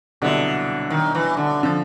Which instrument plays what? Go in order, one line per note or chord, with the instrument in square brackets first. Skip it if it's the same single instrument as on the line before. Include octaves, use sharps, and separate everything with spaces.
[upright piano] C2 B2 F#3 B3 E4 [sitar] D3
[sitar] D#3
E3
D3
[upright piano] D3 F3